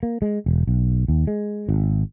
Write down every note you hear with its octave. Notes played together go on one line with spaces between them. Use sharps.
A#3
G#3
E1
B1
D#2
G#3
G#1